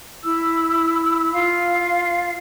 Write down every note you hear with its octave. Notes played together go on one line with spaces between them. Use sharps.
E4 E6
F4 F5